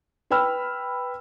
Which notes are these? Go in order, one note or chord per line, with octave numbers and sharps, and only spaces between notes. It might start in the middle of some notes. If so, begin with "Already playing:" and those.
B4 G5 B5 E6 F6